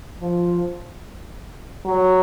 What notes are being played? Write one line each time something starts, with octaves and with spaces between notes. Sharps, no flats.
F3
F#3